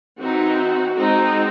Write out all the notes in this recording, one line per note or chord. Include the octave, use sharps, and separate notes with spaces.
E3 C4 D#4 F#4
G#3 C4 D#4